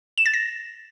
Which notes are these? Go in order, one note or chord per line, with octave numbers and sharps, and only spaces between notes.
E7
A6
A#6